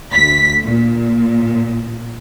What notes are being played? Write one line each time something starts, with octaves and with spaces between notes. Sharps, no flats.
D2 B6
A#2